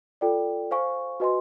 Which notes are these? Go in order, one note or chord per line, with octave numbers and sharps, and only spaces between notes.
F4 A4 D5 G5
C5 F5 G#5 C#6
F#4 B4 D#5 G#5 C6